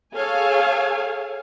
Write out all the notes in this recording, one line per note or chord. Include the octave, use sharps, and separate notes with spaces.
G#4 A4 C#5 F5 G#5